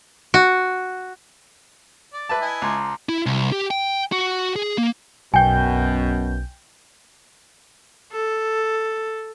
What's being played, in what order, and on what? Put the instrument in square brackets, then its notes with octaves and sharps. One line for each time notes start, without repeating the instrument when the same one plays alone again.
[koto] F#4
[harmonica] D5
[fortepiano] B4 E5 A5
[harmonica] E4 D#5 G#5
[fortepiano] C#2 [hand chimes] A5 A#5 C6
[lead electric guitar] E4
C2
G4
G5
F#4
G#4
A#3
[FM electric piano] B1 G6 [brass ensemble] F#2 B2 B3 [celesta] G5 G#5
[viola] A4